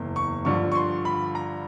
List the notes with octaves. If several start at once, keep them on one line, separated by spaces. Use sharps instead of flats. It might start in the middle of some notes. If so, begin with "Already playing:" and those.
Already playing: F#1 E2
C#6
G2 D3 F3 C#6
C#6
C6
B5
A#5